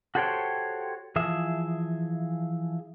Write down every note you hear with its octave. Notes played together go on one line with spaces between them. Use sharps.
F#4 G4 A4 C5 C#5 G5
E3 F3 G#4 E5